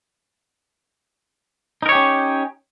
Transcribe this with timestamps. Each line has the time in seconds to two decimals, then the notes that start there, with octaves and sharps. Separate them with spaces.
1.83 D#4
1.86 A#4
1.89 C#5
1.92 G4
1.95 C#4